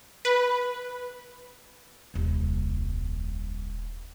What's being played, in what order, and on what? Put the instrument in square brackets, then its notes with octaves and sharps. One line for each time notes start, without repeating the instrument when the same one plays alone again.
[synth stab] B4
[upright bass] D#1 C2